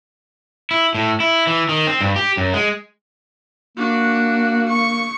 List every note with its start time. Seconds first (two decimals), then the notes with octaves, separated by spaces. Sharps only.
0.71 E4
0.95 A2
1.20 E4
1.47 E3
1.69 D#3
1.87 C4
2.01 G2
2.16 G4
2.37 F#2
2.54 G#3
3.77 A#3 D4 F#4
4.68 C#6